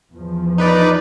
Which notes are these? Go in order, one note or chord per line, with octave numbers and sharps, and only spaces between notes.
E2 F3
D#4 B4 D5